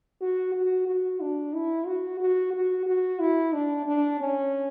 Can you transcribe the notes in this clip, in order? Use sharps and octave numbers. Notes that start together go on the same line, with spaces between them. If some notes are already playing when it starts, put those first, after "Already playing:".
F#4
F#4
F#4
D4
E4
F#4
F#4
F#4
F#4
E4
D4
D4
C#4